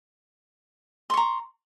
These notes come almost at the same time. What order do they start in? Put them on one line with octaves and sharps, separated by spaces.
C6 C#6 A#5